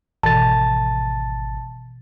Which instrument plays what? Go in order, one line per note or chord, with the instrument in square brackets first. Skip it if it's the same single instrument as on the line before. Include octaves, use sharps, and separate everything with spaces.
[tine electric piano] G#1 A6 [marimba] B2 E3 [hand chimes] A5